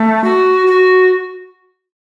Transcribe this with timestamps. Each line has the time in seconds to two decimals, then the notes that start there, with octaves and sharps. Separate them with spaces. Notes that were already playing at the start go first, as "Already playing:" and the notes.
Already playing: A3
0.24 F#4
0.67 F#4